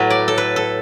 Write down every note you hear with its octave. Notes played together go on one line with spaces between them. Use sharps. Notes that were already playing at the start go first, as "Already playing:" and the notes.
Already playing: A2 F#3 B4
D5
A4
B4
A4